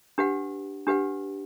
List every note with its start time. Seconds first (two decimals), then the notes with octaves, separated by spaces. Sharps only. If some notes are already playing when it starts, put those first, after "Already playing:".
0.18 D4 G4 B4 F#5
0.87 D4 G4 B4 F#5